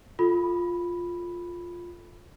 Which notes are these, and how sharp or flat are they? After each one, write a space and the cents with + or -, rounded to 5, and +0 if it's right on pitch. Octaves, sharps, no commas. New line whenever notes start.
F4 +5 A4 +0 B5 +0